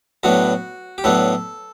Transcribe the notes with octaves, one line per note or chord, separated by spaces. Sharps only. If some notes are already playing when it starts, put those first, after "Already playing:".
A2 F#3 B3 D4 F#4
G4
A2 F#3 B3 D4 A4